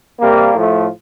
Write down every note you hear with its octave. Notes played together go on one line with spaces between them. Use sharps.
C3 G3 A#3
A2 F3 A3